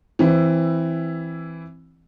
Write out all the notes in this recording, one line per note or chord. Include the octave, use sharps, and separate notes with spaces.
E3 C4 E4